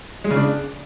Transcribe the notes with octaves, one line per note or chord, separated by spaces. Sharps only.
G#3
C#3
D4